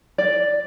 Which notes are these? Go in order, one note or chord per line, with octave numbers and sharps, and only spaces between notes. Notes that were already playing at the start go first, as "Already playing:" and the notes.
D5